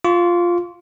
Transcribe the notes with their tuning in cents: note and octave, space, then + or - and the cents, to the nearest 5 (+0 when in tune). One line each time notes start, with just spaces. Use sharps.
F4 +0 C#6 +45